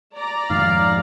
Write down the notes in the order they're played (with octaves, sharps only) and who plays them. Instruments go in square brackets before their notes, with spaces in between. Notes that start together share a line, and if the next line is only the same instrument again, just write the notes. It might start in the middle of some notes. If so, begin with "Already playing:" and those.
[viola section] D5 A#5
[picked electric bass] F2 G#2 D#3 [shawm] F5